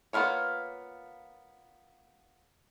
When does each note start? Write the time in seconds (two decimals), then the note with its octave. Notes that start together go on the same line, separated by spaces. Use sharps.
0.13 A#3 B3 E4 F4 C#5